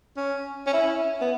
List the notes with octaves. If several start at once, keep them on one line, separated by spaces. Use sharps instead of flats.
C#4
C#4
E4
B3